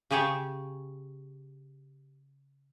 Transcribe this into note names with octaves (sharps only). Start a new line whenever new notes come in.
C#3 G4 G#4 C#5 G5 A5